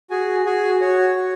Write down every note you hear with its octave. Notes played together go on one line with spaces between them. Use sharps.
F#4 G#4 G#5
F#4 G#4 G#5
F#4 C#5
F#4